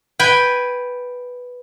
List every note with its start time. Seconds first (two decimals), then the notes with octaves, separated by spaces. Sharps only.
0.19 B4 G5 G#5